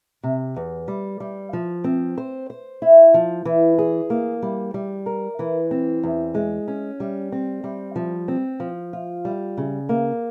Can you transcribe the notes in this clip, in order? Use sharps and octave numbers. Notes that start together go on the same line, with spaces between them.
C3
E2
G3
G3
F3
C4
C5
C5
E4
F3
E3
G#4
A#3
G3
G3
A#4
E3
C4
E2
G#3
C#4
G3
C4
G3
F3
C4
F3
F4
G3
C#3
A#3